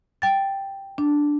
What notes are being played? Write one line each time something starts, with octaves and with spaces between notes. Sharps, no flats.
G5 A6
D4